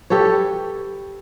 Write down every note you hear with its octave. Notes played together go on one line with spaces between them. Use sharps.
G4 A4 B4 C#5